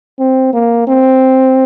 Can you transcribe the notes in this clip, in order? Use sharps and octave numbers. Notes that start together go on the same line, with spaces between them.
C4
A#3
C4